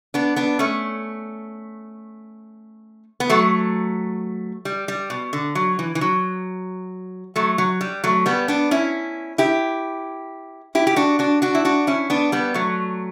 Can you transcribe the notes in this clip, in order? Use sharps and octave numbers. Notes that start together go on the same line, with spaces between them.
B3 D4
B3 D4
A3 C#4
B3
F#3 A3
G3
G3
B2
D3
F#3
E3
E3
F#3
F#3 A3
F#3
G3
F#3 A3
G3 B3
B3 D4
C#4 E4
E4 G4
E4 G4
G4
D4 F#4
D4 F#4
D4 F#4
E4
D4 F#4
C#4 E4
B3 D4
G3 B3
F#3 A3